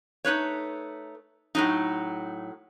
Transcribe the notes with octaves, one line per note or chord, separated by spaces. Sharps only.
A3 D#4 B4 C#5
A2 F#3 D#4